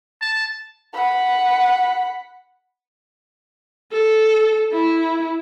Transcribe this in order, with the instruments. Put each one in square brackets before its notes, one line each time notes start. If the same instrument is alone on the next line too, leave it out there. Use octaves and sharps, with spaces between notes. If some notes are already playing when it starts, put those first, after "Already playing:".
[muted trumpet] A5
[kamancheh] F#5 B5
[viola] A4
E4